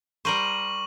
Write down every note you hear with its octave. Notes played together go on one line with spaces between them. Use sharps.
G3 A#4 C5 C#6 D#7 F#7